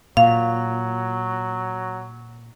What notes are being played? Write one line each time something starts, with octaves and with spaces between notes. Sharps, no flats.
A#2 F#3 F5